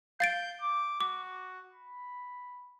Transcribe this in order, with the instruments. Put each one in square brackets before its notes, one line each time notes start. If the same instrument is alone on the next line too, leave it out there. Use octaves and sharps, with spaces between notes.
[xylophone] F5 A6 D7 [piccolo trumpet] G6
[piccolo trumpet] D6
[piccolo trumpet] F#4 [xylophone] D6
[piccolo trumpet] B5